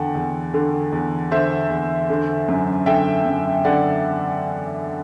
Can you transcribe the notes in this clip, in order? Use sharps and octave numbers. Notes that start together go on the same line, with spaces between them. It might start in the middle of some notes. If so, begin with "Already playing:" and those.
Already playing: E2 D3 F#5 G5 A5
E2
D3
E2
D3 C5 E5
E2
D3
F#2
D3 E5 G5
F#2
D3 D5 F#5